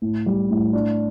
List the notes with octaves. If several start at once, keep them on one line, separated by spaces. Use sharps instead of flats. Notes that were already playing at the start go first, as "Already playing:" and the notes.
A2
G3
A2
D4